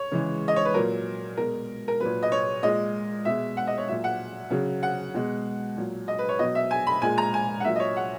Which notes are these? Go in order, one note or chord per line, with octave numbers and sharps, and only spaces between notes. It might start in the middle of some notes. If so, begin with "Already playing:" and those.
Already playing: C#5
C#3 E3 G#3
D#5
C#5
B4
A#2 F#3 A#4
B2 G#3 A#4
A#4
A#2 F#3 B4
D#5
C#5
A#2 G#3 D#5
B2 G#3 E5
F#5
D#5
C#5
A#2 F#3 E5
F#5
C#3 F#3
F#5
B2 G#3
A#2 F#3
D#5
B4
C#5
B2 F#3 D#5
E5
G#5
B5
A#2 G#3 G#5
A#5
G#5
F#5
A#2 F#3 E5
D#5
C#5
F#5